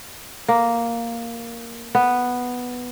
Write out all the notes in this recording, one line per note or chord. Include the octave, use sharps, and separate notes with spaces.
A#3
B3